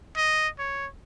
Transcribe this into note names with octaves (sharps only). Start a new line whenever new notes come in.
D#5
C#5